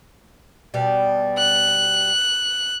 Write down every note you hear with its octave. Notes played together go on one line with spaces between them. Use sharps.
B2 G3
F#6